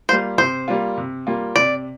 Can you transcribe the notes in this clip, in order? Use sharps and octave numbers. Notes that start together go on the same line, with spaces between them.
G3 A#3 F4 C5
C3 C5
G3 A#3 F4
C3
G3 A#3 F4
C3 D5